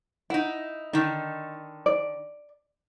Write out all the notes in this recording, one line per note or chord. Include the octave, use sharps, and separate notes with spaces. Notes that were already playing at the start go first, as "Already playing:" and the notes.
D#4 E4 F#5
D3 D#3 D#4
D5